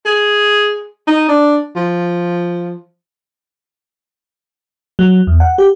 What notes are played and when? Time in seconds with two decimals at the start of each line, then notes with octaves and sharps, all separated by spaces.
0.05 G#4
1.07 D#4
1.28 D4
1.76 F3
4.99 F#3
5.27 E2
5.40 F#5
5.58 G4